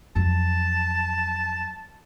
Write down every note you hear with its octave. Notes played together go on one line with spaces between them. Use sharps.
F2 F#3 A5